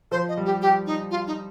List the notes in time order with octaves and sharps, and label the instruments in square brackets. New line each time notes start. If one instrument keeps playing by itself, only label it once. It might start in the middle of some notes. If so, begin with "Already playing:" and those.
[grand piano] F3 [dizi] C5
[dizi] D#5
[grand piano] G3
[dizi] G4
G4
D#4
F4
D#4